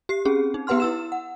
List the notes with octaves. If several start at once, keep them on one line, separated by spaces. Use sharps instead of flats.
G4 C7
C4 C#4 G#4
D#4
B3 G4 B4 F#5 C6 F6
E4 E6 E7
F#5